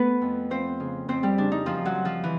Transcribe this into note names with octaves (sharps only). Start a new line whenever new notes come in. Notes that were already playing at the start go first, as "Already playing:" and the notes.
Already playing: A3 B3 B4
F2
F3 C4 C5
C#3
F2 C4 C5
G3 G4
C#3 D4
D#4
F#2 F3 F4
F#3 F#4
F3
F3 F4
E3